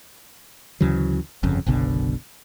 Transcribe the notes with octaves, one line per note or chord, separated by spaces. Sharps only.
D2 C#3 E3 F#3
G1 F2 C#3
F#1 B1 B2 D3